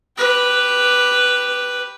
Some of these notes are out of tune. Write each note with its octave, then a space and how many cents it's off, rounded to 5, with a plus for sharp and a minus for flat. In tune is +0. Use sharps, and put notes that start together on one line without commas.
G4 +0 B4 +0